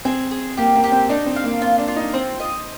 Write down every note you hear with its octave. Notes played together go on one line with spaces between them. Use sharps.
C4 G#4
G#4
A#3 G4
A#3
G4
C4
D4 D#4
C4
F5
A#3
C4 F4
D4
F4
D#4
C4 C5
D#5